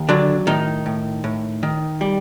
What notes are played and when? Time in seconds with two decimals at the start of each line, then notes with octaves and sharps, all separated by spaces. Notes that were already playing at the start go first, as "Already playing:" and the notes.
Already playing: D#2
0.09 D3 F#3 D4
0.47 A2 D#3 D#4
0.86 A2
1.24 A2
1.63 D#3
2.01 G3